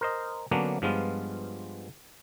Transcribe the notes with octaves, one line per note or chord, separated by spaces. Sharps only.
A#4 C5 D#5
D3 F#3 A#3 B3 C#4 D4
G2 F3 G#3 B3 F4